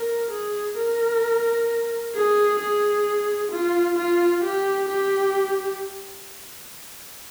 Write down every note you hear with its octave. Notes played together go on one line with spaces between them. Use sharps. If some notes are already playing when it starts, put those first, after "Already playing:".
Already playing: A#4
G#4
A#4
G#4
G#4
F4
F4
G4
G4